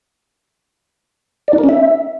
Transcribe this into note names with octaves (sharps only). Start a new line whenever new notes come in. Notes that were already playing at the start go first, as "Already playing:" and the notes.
D5
D#4
A#4
C#4
E5